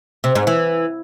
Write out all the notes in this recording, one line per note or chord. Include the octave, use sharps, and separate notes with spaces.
C3
G#2
E3